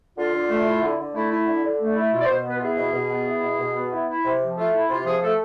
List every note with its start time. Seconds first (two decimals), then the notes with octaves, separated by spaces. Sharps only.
0.16 D3 F4
0.32 D3
0.49 A3
0.65 E4
0.82 D3
0.98 D3
1.14 A3 E4
1.30 E4
1.47 D3
1.63 D3
1.79 A3
1.95 E4
2.12 B2 F4
2.19 D5
2.24 C5
2.28 B2
2.44 B3 B4
2.56 F4
2.61 E4 G#4
2.77 B2
2.93 B2
3.10 B3
3.26 E4
3.42 B2
3.58 B2
3.74 B3
3.92 E4
4.07 E4
4.24 C3
4.39 F3
4.56 A3 F4
4.73 E4
4.89 C3 F4
5.05 F3 G#4
5.21 A3 A4